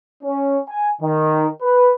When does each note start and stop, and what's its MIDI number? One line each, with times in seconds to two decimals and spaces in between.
0.24 0.60 61
0.69 0.90 80
1.02 1.48 51
1.62 1.92 71